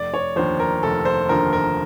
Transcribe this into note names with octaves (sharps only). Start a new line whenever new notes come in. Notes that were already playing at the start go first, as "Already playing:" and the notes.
Already playing: F1 D5
C#5
D#2 D3 F3 C5
A#4
F1 A4
C5
D#2 D3 F3 A#4
A#4